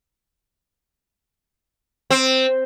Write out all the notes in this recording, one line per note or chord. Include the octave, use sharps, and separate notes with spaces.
C4